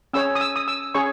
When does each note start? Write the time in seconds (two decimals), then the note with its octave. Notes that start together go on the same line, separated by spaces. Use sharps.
0.13 C#4 G#4 C#5 E6
0.35 D#6
0.41 E6
0.56 D#6
0.68 E6
0.94 C#4 G#4 C#5 C#6